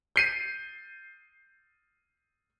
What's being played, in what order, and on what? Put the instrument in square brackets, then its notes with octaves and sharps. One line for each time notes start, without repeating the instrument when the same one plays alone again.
[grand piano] G6 C7 D#7